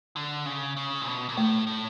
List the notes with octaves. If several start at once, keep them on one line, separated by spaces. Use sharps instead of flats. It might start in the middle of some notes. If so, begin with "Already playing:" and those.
D3
C#3
C#3
A#2
B2
A#2
A2 A3
A2